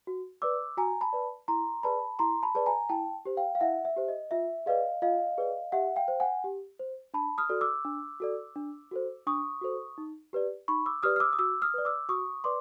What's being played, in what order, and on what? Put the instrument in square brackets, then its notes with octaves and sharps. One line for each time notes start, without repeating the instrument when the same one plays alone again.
[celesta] F#4
B4 D5 D6 E6
F#4 G#5 A#5
A5 B5
B4 D5
E4 A#5 C6
G#4 B4 D5 A5 B5
E4 A#5 C6
A5 B5
G#4 B4 D5 A5
G#5 A#5
E4 G5 A5
G4 C5
F5 G5
F5
E4 E5 F#5
E5
G4 C5
D#5
F4 E5
G#4 B4 D5 D#5 F5
F4 D#5 F5
G#4 B4 D5
G4 E5 F#5
F5 G5
C5
F#5 G#5
G4
C5
D4 A5 B5
D#6 F6
F#4 A4 D5
D6 E6
D4
F#4 A4 D5
D4
F#4 A4 C5
D4 C#6 D#6
F#4 A4 C5
D#4
G4 B4 D5
D#4 B5 C#6
D6 E6
G4 B4 D5 D#6 F6
F6
D6 E6
D#6
F#4 D6 E6
D#6 F6
B4 D5
D6 E6
F#4 C#6 D#6
B4 D5 C6 D6